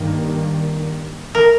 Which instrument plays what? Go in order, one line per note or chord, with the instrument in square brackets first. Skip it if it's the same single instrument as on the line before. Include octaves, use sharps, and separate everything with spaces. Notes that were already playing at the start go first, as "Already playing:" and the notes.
Already playing: [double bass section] G2 D#3 A#3
[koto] A#4